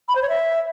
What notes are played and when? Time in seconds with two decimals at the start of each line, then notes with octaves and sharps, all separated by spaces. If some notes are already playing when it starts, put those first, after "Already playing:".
0.08 B5
0.15 C5
0.22 C#5
0.29 E5